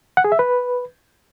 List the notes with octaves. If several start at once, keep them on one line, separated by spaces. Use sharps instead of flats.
F#5
G#4
E5
B4